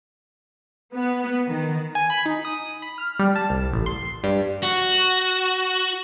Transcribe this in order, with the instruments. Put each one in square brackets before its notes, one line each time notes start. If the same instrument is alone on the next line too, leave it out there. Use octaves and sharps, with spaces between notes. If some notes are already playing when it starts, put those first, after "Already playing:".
[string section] B3
D#3
[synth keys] G#5
B5
D#4
D#6
B5
F6
G3
A5
C2
A1
C6
G2
[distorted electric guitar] F#4